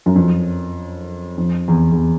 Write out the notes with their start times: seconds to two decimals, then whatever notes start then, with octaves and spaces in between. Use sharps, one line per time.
0.06 F#2
0.16 F2
1.38 F2
1.68 E2
1.92 E2